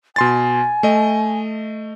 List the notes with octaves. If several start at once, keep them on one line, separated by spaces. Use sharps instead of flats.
B2 G#5 C6 A6
A3 D#5